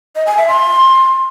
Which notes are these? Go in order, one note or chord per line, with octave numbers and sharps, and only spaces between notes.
D#5
G#5
E5
C6